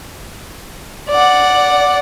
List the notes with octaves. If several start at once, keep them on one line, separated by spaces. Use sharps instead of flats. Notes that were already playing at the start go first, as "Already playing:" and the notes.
D5 F#5